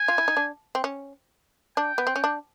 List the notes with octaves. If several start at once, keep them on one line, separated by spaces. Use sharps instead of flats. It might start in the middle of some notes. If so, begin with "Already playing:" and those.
Already playing: G#5
F4
E4
D#4
D4
C4
C#4
D4 G5
B3
C4
C#4
D4